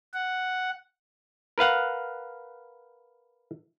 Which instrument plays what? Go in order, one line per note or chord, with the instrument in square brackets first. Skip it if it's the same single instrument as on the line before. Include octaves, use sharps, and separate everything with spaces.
[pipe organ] F#5
[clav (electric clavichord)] A#4 B4 F5 F#5